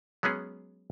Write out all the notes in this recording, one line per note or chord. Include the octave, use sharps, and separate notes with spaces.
F#3 G#3 B3 C#4 G#4